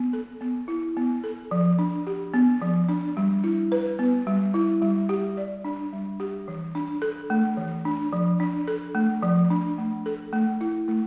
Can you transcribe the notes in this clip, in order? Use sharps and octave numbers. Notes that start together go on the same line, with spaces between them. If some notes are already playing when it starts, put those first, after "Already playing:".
Already playing: B3
A4
B3
E4
B3
A4
F3
D4
G4
B3
F3
D4
G3
E4
B4
B3
G3
E4
G3
G4
D5
D4
G3
G4
E3
D4
A4
A3
E3
D4
F3
D4
A4
A3
F3
D4
A3
A4
A3
E4
A3